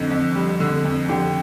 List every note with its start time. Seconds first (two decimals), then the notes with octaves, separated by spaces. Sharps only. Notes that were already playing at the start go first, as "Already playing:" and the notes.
Already playing: F2 D3 D#4
0.10 F2
0.35 G3
0.60 D3
0.84 F2
1.09 D3 G4